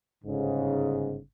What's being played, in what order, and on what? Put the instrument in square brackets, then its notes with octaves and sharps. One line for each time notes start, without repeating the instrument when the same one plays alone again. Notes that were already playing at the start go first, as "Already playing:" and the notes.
[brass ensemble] G1 G#2 C#3